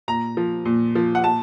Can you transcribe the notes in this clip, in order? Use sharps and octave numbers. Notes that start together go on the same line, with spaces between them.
A#2 A#5
F3
A#2
F3
F#5
A#2 A5